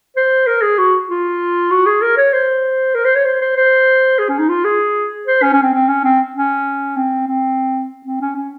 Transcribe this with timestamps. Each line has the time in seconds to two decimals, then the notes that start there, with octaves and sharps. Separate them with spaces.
0.17 C5
0.47 A#4
0.62 G#4
0.78 F#4
1.09 F4
1.71 F#4
1.86 G#4
2.02 A#4
2.17 C#5
2.33 C5
2.95 A#4
3.05 C5
3.15 C#5
3.26 C5
3.41 C5
3.56 C5
4.19 G#4
4.28 C#4
4.39 D#4
4.49 F4
4.65 G#4
5.27 C5
5.42 C#4
5.53 C#4
5.63 C4
5.73 C4
5.88 C#4
6.04 C4
6.35 C#4
6.97 C4
7.27 C4
8.05 C4
8.21 C#4
8.36 C#4